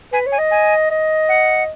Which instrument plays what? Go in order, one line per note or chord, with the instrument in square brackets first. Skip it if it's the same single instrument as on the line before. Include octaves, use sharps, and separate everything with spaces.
[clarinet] B4 [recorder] G#5
[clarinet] C#5
[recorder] G#5
[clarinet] D#5
[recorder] G#5
[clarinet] D#5
[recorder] F#5